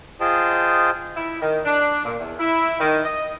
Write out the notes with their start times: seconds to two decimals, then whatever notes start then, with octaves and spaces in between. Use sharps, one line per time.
0.20 F4 G#4 C5 D#5 G5 A5
1.16 E4
1.41 D#3
1.65 D4
2.05 A#2
2.19 E2
2.39 E4
2.80 D#3
3.05 D#5